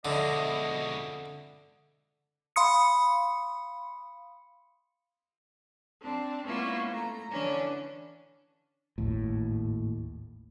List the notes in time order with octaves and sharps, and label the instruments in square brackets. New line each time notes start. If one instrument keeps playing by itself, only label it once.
[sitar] F2 E5 [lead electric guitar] B2 G#3 [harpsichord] D3 [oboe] D#5
[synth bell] F5 B5 C6 D#6 C#7
[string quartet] C4 D4
G#3 A#3 B3 C#4 E4 F4
A3 A#5
D3 E3 C#4 D4
[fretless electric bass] G#1 D#2 A2